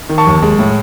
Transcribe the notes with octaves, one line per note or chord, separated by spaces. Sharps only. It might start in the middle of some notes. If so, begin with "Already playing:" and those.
D#3
A5 C#6
D#2
G#3
A2